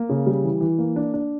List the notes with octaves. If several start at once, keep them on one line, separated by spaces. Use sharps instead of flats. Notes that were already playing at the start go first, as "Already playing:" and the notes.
Already playing: A#3
C#3
G3
E3
E3
A#3
D4
D4